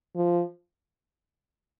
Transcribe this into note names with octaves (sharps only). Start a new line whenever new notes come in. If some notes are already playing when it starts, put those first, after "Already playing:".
F3